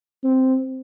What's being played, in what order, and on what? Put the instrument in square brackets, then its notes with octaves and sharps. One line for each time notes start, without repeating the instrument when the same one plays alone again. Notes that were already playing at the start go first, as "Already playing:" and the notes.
[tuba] C4